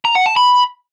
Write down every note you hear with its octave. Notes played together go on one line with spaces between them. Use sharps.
A#5
F#5
A5
B5